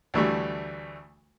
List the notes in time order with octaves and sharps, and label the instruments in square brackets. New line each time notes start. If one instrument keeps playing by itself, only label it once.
[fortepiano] D2 E3 G3 A3